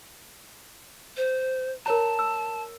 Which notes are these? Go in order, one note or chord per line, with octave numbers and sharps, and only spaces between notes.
C5
A#4 C#5 A5 A#5
E6